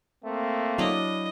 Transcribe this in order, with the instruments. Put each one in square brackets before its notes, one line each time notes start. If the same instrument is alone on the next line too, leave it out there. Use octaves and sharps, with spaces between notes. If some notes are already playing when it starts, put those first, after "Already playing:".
[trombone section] A3 A#3 C4
[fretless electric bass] F#3 [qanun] D4 E4 F5 [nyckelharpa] D#5